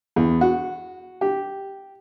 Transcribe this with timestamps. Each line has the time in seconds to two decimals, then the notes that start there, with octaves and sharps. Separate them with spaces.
0.16 E2
0.41 F#4
1.21 G4